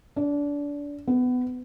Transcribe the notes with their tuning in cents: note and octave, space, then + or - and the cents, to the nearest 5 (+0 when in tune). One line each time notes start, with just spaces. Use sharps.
D4 -25
B3 +20